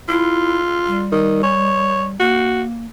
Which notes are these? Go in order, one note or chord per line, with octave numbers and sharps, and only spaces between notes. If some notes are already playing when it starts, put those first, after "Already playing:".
E4 F4
G3
D#3
C#5
A#3 F#4